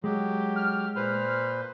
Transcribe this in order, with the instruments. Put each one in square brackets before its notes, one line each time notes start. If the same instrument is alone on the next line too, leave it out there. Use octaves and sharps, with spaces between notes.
[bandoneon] F#3 G4 [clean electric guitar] G#3
[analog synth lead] F6
[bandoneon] A#2 B4 C5